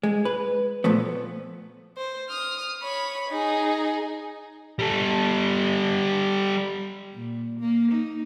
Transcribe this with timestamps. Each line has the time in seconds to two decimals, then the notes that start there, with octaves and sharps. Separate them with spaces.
0.03 G#3
0.25 B4
0.84 A#2 F3 A3 B3
1.97 C5
2.29 D#6 F6
2.83 C#5 B5
3.29 D#4 G#4
4.79 G3 A4
7.14 A#2
7.59 A#3
7.91 D#4